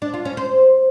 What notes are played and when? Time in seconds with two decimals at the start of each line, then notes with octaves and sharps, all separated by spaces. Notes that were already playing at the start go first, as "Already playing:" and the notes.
0.02 D4
0.14 F4
0.25 C#4
0.37 C5